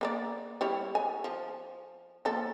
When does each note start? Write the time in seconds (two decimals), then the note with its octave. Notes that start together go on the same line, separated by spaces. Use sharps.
0.01 A#3 B4 D5
0.61 G3 E4 C#5
0.95 G#5
1.24 F3
2.25 F3 A#3 A4